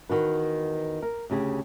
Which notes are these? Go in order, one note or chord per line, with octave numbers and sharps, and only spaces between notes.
E2 D#3 F#4 B4
A#4
D2 C#3 G4 G#4